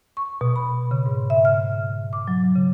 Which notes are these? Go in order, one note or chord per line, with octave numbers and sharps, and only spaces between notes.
C#6
B2
B5
C#3
G#2
E5
F6
D6
F#3
C#3